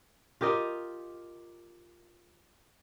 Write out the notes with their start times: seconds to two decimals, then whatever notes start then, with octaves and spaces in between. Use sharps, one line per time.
0.41 F4 G4 A#4 D#5